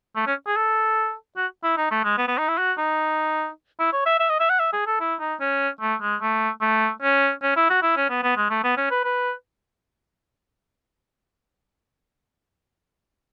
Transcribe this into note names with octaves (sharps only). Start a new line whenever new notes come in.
A3
C#4
G#4
A4
F#4
E4
D#4
A3
G#3
B3
B3
D#4
E4
F#4
D#4
E4
C#5
E5
E5
D#5
E5
F#5
E5
G#4
A4
E4
D#4
C#4
A3
G#3
A3
A3
C#4
C#4
E4
F#4
E4
C#4
B3
B3
G#3
A3
B3
C#4
B4
B4